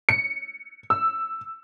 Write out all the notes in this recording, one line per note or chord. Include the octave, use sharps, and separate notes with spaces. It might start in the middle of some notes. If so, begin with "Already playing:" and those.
C#7
E6